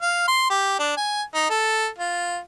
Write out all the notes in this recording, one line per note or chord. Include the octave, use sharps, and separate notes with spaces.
F5
C6
G4
D4
G#5
D#4
A4
F4